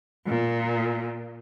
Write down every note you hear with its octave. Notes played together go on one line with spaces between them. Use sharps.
A#2